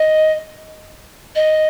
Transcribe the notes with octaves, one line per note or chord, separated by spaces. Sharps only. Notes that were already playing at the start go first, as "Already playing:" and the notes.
Already playing: D#5
D#5